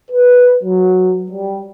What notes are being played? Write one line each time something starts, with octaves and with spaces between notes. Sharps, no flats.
B4
F#3
G3